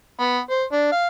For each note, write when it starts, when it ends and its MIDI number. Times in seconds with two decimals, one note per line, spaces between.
0.20 0.39 59
0.50 0.63 72
0.72 0.88 62
0.92 1.07 77